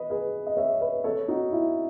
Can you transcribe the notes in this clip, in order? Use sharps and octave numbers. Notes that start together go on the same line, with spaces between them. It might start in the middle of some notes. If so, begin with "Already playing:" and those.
Already playing: B4 D#5
G#4 B4
D#5
C#5 E5
B4 D#5
A4 C#5
D#4 F#4
E4